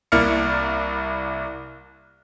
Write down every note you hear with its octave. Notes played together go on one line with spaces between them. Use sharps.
C2 A#3 E4 D5 F6 C#7